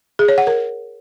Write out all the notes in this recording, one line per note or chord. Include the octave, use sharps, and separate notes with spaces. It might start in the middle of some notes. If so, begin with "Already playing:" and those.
G#4
C#5
F#5
A#4